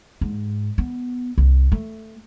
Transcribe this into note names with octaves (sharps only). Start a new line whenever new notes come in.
G#2
B3
C2
A3